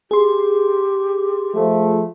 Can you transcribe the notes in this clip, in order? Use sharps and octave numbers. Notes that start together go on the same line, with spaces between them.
G4 G#4 C6
F3 A3